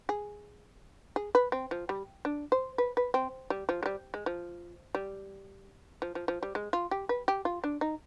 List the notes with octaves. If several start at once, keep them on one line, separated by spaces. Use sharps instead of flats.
G#4
G#4
B4
C4
F3
G3
D4
C5
B4
B4
C4
G3
F3
G#3
G3
G#3
F3
G3
F3
F3
F3
G3
G#3
F4
G4
B4
G4
F4
D4
D#4